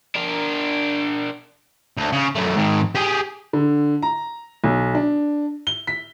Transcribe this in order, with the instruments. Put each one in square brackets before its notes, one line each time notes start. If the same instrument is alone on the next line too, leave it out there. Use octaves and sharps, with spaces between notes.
[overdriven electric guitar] D4 A#4
[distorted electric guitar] D2
C#3
F#2 A3
G#2 D#3
G4 G#4
[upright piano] D3
A#5
B1
D4
G7
B6